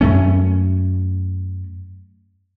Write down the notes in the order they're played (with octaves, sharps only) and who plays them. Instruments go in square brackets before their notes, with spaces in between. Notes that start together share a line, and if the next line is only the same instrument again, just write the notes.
[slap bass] F#2 A3 C#4